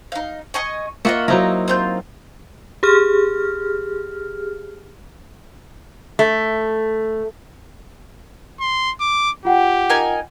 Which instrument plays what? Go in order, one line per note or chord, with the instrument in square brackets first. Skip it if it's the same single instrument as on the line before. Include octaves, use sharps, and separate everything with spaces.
[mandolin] D#4 F5
D#5 G#5 C#6
[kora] A#3 F4 E5 [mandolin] D#5 F#5 C#6
[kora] F#3 D#4 E4 [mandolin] C4 F5 A#5
[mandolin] C4 F4 G6
[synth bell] G4 G#4 F6
[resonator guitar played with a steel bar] A3
[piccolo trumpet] C6
D6
[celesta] F4 F#5 G5 [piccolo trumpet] G4
[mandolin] D#4 A#4 G#5